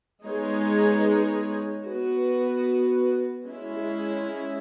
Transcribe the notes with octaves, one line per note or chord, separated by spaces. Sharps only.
G#3 B3 D#4 G#4 C#5
B3 F#4 B4
G#3 C#4 E4